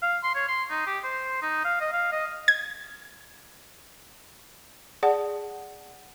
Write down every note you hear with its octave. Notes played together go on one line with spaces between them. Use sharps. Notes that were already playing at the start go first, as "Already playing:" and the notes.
F5
C6
C#5
C6
D#4
G4
C5
D#4
F5
D#5
F5
D#5
G#6
G#4 D5 F#5 A5